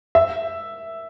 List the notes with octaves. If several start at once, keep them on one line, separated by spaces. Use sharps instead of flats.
E5